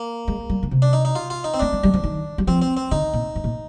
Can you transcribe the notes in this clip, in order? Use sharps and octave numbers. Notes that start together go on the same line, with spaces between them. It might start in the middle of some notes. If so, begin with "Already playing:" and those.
Already playing: A#3
G#3
G3
D3
C3
D4
D#4
D#4
F4
F4
D#4
C4
A#3 D4
G#3
G3
F3
D#3
G3
F3 C4
C4
C4
D3 D#4
A#2
G#2
A#2